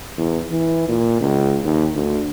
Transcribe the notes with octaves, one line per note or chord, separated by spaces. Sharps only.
E2
E3
A#2
C#2
D#2
D2